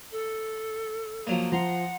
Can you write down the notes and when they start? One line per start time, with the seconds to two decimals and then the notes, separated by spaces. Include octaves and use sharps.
0.11 A4
1.27 F3 F#3 A#3
1.52 F3 F#5 A#5 C6